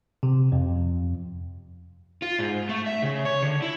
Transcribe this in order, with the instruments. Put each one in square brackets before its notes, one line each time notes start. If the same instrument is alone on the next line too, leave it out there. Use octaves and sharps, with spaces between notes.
[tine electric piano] C3
F2
[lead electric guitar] F4
G#2
A3
E5
C#3
C#5
D3
E4